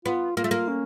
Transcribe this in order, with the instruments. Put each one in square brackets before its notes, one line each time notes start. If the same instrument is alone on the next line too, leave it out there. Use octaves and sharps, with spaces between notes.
[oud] B3 [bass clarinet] F4
[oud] A#3 [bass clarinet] F4
[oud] A3
A#3
[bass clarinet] C#4